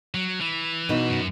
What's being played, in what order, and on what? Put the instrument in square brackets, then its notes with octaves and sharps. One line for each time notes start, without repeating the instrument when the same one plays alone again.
[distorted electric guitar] F#3
E3
[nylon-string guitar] B2 D#4
[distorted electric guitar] F#2